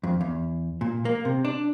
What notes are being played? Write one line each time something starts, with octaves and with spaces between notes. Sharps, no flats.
F2
E2
A#2
A#3
C3
D4